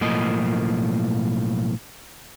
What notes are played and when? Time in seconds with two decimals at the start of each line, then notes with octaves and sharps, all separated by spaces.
0.01 B1 A2 F3 A#3 D#5